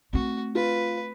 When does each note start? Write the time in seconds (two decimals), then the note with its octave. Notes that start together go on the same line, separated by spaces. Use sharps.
0.13 A3 C4 F#4
0.55 F4 B4